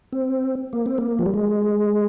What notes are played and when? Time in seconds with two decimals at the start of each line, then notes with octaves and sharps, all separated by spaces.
0.13 C4
0.73 A#3
0.86 C4
0.98 A#3
1.19 F3
1.26 G3
1.34 G#3